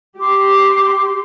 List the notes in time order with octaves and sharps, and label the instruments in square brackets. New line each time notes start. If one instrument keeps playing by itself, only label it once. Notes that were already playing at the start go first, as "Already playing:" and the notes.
[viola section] G4 [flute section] C6 D6